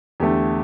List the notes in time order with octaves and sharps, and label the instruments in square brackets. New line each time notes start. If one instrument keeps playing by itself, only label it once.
[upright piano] E2 D3 A3 G4